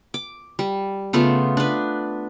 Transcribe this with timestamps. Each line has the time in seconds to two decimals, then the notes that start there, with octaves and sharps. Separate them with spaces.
0.14 D6
0.59 G3
1.13 C#3 A3 B3 F4
1.57 D4 B4